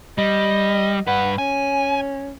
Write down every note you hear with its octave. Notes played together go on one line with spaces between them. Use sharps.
G3 D#5
G2 B4 F#5
C#4 G#5